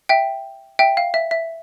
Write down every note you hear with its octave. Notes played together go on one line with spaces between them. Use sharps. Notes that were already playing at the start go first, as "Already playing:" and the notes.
E5 G5
E5 G5
F5
E5
E5